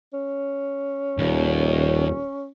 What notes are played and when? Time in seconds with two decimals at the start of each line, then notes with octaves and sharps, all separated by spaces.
0.13 C#4
1.18 D#1 D#2